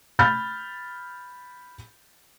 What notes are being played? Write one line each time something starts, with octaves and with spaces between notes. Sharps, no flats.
B5 F6 G6 A6